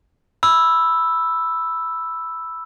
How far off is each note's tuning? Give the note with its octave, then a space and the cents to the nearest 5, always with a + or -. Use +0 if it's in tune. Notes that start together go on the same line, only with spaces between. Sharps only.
B5 +0 E6 +0